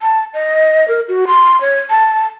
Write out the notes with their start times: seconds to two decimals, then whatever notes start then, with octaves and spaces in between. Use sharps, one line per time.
0.01 A5
0.34 D#5
0.88 A#4
1.08 F#4
1.27 C6
1.61 C#5
1.90 A5